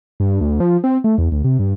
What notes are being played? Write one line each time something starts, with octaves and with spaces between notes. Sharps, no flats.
G2
D2
F3
C4
A3
E2
D2
C3
G2